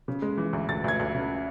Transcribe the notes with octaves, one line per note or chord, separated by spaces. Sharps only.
C#3
G#3
E3
D2
D2 A6
D2 G#6
D2
C#3